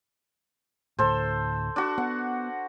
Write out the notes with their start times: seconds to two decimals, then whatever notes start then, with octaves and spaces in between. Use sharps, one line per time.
0.99 D2 A2 A4 C5
1.76 D4 F#4
1.98 B3 F#5